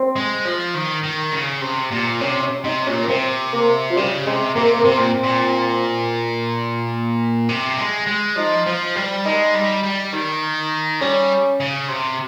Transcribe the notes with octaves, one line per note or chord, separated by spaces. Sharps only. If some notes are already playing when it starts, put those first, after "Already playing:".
Already playing: C4
G#3
F3
D#3
D#3
C#3
C3
A#2
C3 C#4
C#4
C3 D#4
A#2 C#4
A#3
C3 C4
A#3
F3
C#3 G3
C3 G#3
C3 A#3
A#3
C3 C4
A#2
A#2
C3
G#3
G#3
F3 D#4
F3
G3
G#3 D#4
G3
G3
D#3
G3 C#4
C#3
C3